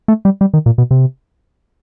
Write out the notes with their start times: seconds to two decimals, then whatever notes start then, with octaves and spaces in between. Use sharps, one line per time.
0.08 A3
0.25 G3
0.41 G3
0.54 D#3
0.66 A#2
0.78 B2
0.91 C3